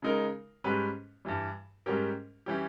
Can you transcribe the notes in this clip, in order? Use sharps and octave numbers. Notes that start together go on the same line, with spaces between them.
C#3 G#3 D#4 A#4
G#2 G3 C#4 G4 B4
G2 E3 G3
G#2 G3 C#4 G4 A#4
E3 G3 C#4 G4